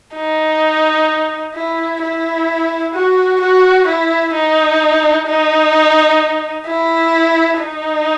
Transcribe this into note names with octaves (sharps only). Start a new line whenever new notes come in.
D#4
E4
E4
F#4
F#4
E4
D#4
D#4
E4
D#4